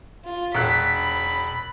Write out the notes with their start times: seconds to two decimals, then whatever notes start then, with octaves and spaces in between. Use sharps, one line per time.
0.25 F4
0.55 E1 F#6 B6
0.97 B5